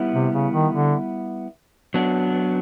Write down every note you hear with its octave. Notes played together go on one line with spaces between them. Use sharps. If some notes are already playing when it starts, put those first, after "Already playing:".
Already playing: G3 B3 E4
C3
C#3
D#3
D3
F#3 B3 D4